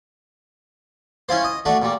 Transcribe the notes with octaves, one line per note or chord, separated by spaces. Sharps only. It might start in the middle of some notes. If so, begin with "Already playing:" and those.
C#4 E4 F4 C5
D#5
A3 D4 F#4
A#2 G3